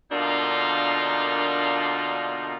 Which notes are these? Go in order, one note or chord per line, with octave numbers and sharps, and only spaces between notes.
B2 D3 A#3 D4 D#4 F4